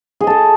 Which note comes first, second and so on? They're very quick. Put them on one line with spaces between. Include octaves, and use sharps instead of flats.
G#4 D#5 A5 A4